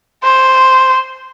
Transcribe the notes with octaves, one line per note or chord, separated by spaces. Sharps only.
C5